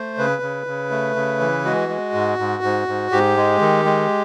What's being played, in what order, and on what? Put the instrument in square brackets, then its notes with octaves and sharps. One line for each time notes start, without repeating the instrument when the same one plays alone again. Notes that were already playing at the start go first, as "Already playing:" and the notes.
Already playing: [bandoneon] A3 C5
C#3 B4
C#3
C#3
A3
C#3
E3
G#3 F#4
G#3
G#2
G#2
G#2
G#2
G#2 G4
G#3
D#3
G#3